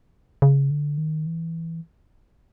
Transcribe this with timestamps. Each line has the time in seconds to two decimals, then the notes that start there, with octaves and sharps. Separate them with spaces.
0.42 C#3
0.71 D3
0.98 D#3
1.26 E3